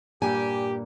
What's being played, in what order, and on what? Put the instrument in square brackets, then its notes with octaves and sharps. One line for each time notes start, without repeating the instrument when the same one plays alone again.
[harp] G2 A#2 [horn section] G4 [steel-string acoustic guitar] G#5